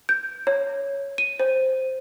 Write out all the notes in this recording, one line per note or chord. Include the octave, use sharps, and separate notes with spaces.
G6
C#5
D#7
C5